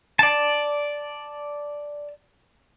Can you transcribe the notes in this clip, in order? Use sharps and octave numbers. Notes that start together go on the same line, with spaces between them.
D5 A5